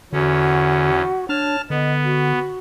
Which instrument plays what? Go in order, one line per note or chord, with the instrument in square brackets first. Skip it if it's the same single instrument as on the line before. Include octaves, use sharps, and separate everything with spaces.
[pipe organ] E2 C#4 [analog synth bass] D3 [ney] F#4
[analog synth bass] D4 [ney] C#5 [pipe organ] A5 F6
[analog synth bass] D3 [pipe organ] B3 [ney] D#5
[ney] F#4